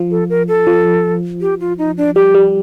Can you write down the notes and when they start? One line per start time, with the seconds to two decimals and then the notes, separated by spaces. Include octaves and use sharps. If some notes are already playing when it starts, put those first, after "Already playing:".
Already playing: F3
0.11 A4
0.30 A#4
0.48 A4
0.67 F3
1.41 G4
1.60 F4
1.78 D#4
1.97 D4
2.16 G3 G4
2.35 G3